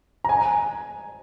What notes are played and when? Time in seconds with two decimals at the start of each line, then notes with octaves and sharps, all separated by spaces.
0.24 A#5
0.29 G#5